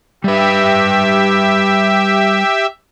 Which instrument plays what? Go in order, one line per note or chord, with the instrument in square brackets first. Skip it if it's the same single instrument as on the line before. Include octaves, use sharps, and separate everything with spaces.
[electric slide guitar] G3 B4 [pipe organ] G4 E5